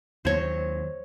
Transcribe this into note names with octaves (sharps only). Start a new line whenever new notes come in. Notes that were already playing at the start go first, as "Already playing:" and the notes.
D#2 F#3 C5 C#5